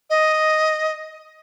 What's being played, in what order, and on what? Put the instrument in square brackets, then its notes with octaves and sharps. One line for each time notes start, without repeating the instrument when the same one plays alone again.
[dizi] D#5